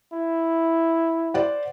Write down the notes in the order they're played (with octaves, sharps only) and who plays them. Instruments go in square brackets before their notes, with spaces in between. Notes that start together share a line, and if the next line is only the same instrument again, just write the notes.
[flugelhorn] E4
[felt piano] C5 D5 F#5